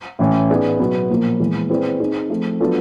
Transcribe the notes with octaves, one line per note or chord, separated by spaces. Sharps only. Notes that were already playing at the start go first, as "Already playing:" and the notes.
A2 E3 A3 C#4
B3 D#4 G#4 B4 D5
B2 F#3 B3
A#2 F3 A#3
E3 G#3 B3
C4 E4 G#4 B4 D5
C4 D#4 G#4
F3 A3 C4
F#3 B3 D4 F4 A4